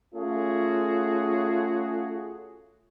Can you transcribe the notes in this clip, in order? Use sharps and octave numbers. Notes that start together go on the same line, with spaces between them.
A3 C#4 F4 F#4 G#4